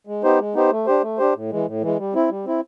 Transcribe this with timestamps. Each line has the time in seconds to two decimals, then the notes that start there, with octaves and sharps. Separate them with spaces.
0.07 G#3
0.24 B3 D#4 G4 C5
0.39 G#3
0.54 B3 D#4 G4 C5
0.71 A3
0.87 D4 G4 C5
1.03 A3
1.18 D4 G4 C5
1.35 A2
1.51 E3 G#3
1.66 A2
1.81 E3 G#3
1.98 G3
2.13 C4 E4
2.29 G3
2.45 C4 E4